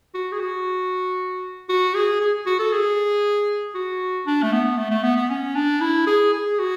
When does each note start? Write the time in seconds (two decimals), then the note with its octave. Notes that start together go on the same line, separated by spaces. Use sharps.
0.14 F#4
0.32 G#4
0.40 F#4
1.69 F#4
1.94 G#4
2.20 G#4
2.46 F#4
2.59 A4
2.72 G#4
3.75 F#4
4.26 D4
4.43 A3
4.52 B3
4.78 A3
4.91 A3
5.03 B3
5.17 B3
5.30 C#4
5.55 D4
5.81 E4
6.07 G#4
6.33 G#4
6.59 F#4